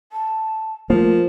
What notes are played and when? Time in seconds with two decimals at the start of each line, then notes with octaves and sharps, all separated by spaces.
0.12 A5
0.90 F3 A3 A#3 A#4